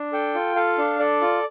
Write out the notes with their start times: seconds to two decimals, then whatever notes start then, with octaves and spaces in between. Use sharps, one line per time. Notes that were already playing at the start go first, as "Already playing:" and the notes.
Already playing: D4
0.12 A4 G5
0.34 F4
0.56 A4 F5
0.78 D4
0.99 A4 D5
1.21 F4